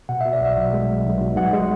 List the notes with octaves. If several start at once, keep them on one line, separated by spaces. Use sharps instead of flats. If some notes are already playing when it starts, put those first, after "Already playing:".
B2 F#5
B2 E5
D5
B1 E5
B1
G#3
B1
B1
B2
B1 F#5
G#3